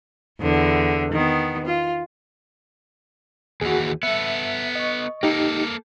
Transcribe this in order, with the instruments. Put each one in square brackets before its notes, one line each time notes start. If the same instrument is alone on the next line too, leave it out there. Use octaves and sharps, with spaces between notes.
[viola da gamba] E2 D3
D#3 B3
F4
[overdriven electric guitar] D#2 E3 [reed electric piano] F#4 G#4
[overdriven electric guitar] B3 A4 [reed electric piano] E5
[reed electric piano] D#5 C#6
[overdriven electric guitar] A#3 A4 [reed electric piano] D#4 G4